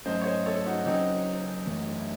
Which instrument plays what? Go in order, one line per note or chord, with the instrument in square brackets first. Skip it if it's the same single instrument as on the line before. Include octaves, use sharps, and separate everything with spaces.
[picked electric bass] G#2 F#3 A3 C#4 [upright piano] C5 D#5
[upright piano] C#5
C5 D#5
A4 C#5
D#4 F#4
[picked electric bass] C#3 F#3 C#4 [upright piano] C4 D#4
[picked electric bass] F#2 E3 A3